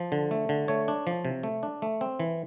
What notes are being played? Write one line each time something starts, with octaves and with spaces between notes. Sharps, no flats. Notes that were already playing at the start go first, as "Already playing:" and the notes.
Already playing: F3
D3
A3
D3
A3 C#5
D4
F3
C3
A3
D4
A3
C4
E3